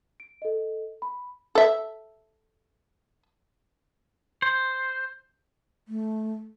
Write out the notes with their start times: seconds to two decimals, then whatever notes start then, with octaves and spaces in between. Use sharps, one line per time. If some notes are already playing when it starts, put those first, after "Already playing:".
0.20 D7
0.42 A4 D#5
1.02 B5
1.55 A4 E5
4.42 C5
5.88 A3